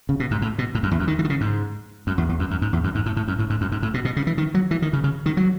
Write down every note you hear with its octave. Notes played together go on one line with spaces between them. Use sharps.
C#3
B2
G#2
A2
B2
A2
F#2
E2
F#2
D#3
E3
D#3
C#3
G#2
F#2
E2
E2
F#2
F#2
G#2
E2
F#2
G#2
A2
A2
F#2
A2
G#2
F#2
G#2
A2
B2
B2
C#3
E3
D#3
F#3
E3
D#3
C#3
C#3
D#3
F#3